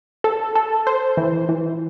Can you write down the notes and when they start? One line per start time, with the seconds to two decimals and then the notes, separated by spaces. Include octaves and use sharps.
0.24 A4
0.55 A4
0.87 C5
1.17 E3
1.49 E3